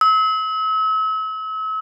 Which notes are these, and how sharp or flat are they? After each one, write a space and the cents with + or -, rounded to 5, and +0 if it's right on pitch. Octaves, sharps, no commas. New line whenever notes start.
E6 -40